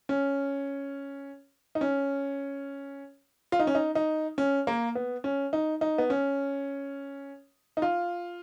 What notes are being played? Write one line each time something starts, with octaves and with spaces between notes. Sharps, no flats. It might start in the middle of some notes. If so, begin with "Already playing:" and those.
C#4
D#4
C#4
F4
D#4
C#4
D#4
D#4
C#4
A#3
B3
C#4
D#4
D#4
B3
C#4
D#4
F4